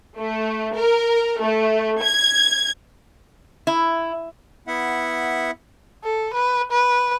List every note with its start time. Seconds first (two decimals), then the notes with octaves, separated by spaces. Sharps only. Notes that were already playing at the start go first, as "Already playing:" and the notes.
0.18 A3
0.75 A#4
1.42 A3
2.03 G#6
3.67 E4
4.67 B3 E4 E5 F#5
6.04 A4
6.34 B4
6.71 B4